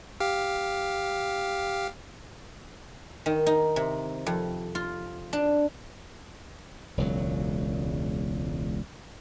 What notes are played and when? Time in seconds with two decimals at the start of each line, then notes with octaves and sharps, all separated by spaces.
0.20 G4 F5
3.26 D#3
3.46 D#4
3.76 C3
4.26 F2
4.75 F4
5.33 D4
6.97 E1 C#2 F#3